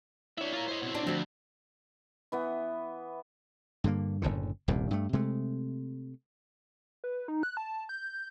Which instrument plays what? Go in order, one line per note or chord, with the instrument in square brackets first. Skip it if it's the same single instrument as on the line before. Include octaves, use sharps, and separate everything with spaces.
[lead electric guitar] D4 E5 [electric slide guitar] E4 C#5
[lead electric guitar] F4 A#4
C5 D#5
B2 C4
[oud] D4
[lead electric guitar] D2 [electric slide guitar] D3 F3 [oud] C4 F#4
[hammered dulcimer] E3 B3
[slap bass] G2 D3 A#3
F#1 B1 A2 D3
D#1 C2 G2 A#2
G2 A3
C3 G#3 A3
[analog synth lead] B4
D#4
F#6
A5
G6